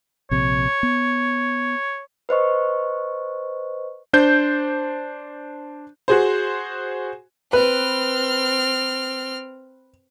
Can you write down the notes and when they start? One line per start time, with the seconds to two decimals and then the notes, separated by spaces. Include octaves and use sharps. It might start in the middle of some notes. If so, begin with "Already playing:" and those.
0.31 A#1 C3 C#5
0.83 B3
2.29 B4 C5 D#5 C#6
4.13 D4 C5 G6
6.08 F#4 G#4 C5
7.53 C4 B4 F6